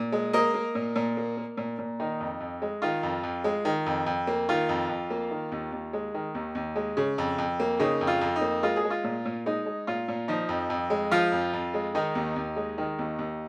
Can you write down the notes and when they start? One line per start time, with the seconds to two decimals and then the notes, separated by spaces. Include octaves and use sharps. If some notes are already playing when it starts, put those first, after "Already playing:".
Already playing: A#2
0.12 G#3
0.33 A#3 A#4 D#5
0.54 A#3
0.75 A#2
0.96 A#2
1.17 A#3
1.37 A#3
1.57 A#2
1.78 A#2
2.00 D#3 D#4
2.20 F2
2.40 F2
2.62 G#3
2.82 D#3 F4
3.03 F2
3.23 F2
3.44 G#3
3.65 D#3
3.86 F2
4.06 F2
4.27 A#3
4.49 D#3 F4
4.69 F2
4.89 F2
5.10 A#3
5.31 D#3
5.52 D#2
5.72 D#2
5.93 G#3
6.14 D#3
6.35 D#2
6.55 D#2
6.76 G#3
6.97 C#3
7.18 F2
7.38 F2
7.60 A#3
7.80 C#3 D#4
8.01 F2
8.07 F4
8.21 F2
8.36 D#4
8.41 A#3
8.63 G#3 F4
8.76 G#4
8.84 G#3
8.90 F4
9.04 A#2
9.25 A#2
9.46 G#3 D#4
9.66 G#3
9.87 A#2 F4
10.08 A#2
10.28 F3 D#4
10.49 F2
10.70 F2
10.90 G#3
11.11 F3 F4
11.32 F2
11.53 F2
11.74 G#3
11.95 D#3 D#4
12.15 D#2
12.36 D#2
12.56 G#3
12.78 D#3
12.99 D#2
13.19 D#2